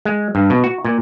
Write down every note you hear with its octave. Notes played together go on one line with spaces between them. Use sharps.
G#3
G2
B2
F#4
A#2